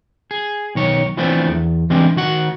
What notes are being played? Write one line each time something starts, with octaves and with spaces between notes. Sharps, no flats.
G#4
B1 D#3 C#5
E3 F3 A3 B3 C4 D4
E2
E3 G3 G#3 C4 D4
D#3 F#4 F#5